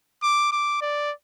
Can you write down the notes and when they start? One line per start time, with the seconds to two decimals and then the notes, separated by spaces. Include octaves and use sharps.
0.22 D6
0.52 D6
0.81 D5